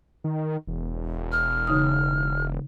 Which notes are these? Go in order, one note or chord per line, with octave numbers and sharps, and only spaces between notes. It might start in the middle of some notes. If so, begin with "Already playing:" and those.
D#3
E1
F6
C#3 D#4 D#6